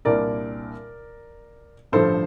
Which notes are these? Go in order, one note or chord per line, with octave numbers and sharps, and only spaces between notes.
C2 A#2 G3 A#3 D4 A#4 D5
A1 G2 D3 F3 A4 C5